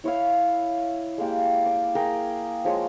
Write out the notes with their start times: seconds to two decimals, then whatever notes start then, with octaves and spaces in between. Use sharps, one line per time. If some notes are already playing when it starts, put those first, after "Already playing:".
0.04 E4 C#5 E5 F5
1.18 G#3 A#3 G4
1.66 D6
1.95 G#4 A#4 G5
2.65 F3 G#3 C#5